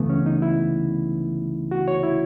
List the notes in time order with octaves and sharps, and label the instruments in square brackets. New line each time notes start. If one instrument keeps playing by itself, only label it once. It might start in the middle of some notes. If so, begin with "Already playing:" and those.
Already playing: [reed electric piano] C#2 C#3 E3 A3 B3
C#4
D#4
E4
F#4
C#5
E4